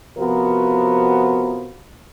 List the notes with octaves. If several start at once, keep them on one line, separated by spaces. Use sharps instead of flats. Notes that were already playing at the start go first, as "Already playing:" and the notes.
C3 F3 B3 F4 F#4 A#4